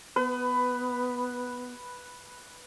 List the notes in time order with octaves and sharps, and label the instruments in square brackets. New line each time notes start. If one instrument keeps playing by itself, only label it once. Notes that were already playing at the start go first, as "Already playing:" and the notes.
[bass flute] B3 [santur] B4